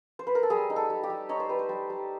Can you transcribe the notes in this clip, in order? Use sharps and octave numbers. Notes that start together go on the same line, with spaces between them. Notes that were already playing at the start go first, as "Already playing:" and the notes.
C5
B4
A#4
A4
G3 G#4
D#4
A4
G3
G4
G3
D#4 C#5
C5
G3 B4
C5
G3
G3